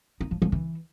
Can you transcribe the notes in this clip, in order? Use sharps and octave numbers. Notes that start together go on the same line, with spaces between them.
D#4
F3
F3
E3